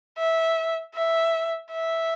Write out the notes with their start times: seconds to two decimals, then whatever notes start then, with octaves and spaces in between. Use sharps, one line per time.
0.18 E5
0.95 E5
1.71 E5